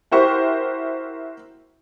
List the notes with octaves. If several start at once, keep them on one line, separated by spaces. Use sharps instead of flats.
E4 F#4 G4 A#4 C5 C#6